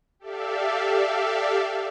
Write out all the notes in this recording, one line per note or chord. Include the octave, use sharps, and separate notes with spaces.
G4 A4 D5 E5 F5